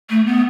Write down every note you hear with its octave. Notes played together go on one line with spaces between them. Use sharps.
A3
B3